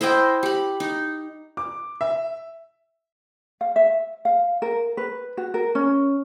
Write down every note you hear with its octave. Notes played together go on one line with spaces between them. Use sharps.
E4 C5 D#5 G5
G4 B5
D#4
D6
E5
F5
E5
F5
A#4
B4
F#4
A#4
C#4